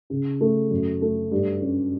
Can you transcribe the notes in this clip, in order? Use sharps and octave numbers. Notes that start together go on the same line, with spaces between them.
C#3
A3
F#2
A3
G2
C#4